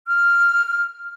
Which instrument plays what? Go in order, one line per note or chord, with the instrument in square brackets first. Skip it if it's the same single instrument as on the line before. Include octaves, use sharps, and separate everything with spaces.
[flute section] F6